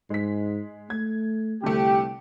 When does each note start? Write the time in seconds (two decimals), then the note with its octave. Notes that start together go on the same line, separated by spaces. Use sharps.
0.10 G#2 G#3 B6
0.90 A3 G#6
1.64 C2 D3 A3 G4